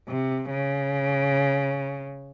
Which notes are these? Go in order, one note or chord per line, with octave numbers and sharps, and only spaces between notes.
C3
C#3